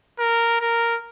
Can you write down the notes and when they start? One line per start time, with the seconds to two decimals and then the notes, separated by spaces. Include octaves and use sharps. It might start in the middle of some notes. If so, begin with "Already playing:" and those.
0.19 A#4
0.60 A#4